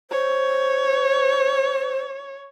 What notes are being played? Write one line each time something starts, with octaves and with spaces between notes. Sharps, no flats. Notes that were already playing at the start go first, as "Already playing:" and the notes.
C5 C#5